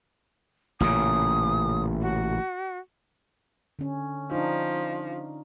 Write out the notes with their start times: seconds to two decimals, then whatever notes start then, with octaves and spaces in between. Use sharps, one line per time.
0.80 A1 A#2 C#3 D#6
2.01 F#4
3.79 D3 C#4
4.31 F3 D4 D#4